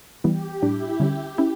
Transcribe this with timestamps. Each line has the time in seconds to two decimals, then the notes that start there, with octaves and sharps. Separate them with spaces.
0.24 E3 G3 B3 G4
0.62 A2 G3 D4 E4
0.99 D3 G3 C#4 G4
1.38 C#4 E4